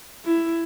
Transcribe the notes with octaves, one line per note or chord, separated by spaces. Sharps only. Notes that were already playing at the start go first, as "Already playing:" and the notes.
E4